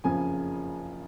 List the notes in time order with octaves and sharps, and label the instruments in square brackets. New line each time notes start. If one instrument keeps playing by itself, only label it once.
[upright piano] F#1 F2 C#3 F3 G#5